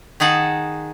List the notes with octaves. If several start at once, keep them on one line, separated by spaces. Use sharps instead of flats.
D#3 D#4 G#4 F#5 A5